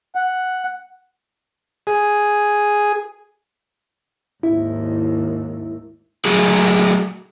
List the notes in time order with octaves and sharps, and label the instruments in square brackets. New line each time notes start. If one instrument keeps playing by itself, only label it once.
[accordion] F#5
[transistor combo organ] G#4
[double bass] G#1 D#2 [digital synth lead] E4
[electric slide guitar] F#3 A3 F#4 G#4